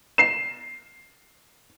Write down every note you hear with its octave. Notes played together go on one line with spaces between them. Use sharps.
C7 E7